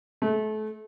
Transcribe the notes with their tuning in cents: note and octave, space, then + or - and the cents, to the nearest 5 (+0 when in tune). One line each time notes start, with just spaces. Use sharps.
A3 -30